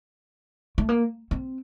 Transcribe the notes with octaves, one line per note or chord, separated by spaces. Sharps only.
A3
A#3
C4